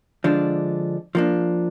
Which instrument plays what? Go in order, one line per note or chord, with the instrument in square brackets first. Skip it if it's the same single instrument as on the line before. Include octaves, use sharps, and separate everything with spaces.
[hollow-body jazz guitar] D3 F3 G#3 D4
F3 A#3 D4